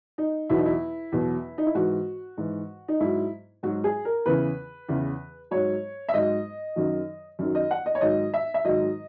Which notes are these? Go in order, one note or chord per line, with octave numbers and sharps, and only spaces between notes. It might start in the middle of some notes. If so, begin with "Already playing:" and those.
D#4
E2 B2 F#3 E4
D#4
E4
E2 B2 F#3
D#4
E4
G#2 E3 F#4
G#2 E3
D#4
G#2 F#3 E4
G#2 F#3 F#4
G#4
A#4
E2 C#3 E3 B4
E2 C#3 E3
G#2 F#3 C#5
E5
G#2 F#3 D#5
F#2 D#3 F#3
F#2 D#3 F#3
D#5
F#5
D#5
C#5
G#2 D#3 F#3 D#5
E5
E5
G#2 D#3 F#3 D#5